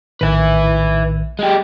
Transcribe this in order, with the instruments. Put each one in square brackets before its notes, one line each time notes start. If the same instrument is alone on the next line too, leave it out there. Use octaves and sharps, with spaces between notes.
[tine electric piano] A#1 A2 D#3 [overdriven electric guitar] B4 E5
[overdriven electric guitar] G#3 G4